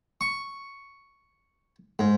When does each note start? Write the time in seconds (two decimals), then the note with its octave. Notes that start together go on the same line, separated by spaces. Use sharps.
0.21 C#6
1.99 G#2